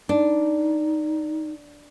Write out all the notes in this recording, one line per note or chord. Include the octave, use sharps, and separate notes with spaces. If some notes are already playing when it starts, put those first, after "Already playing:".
D4 D#4